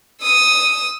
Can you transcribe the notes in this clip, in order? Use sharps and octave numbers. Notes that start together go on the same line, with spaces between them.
D#6 E6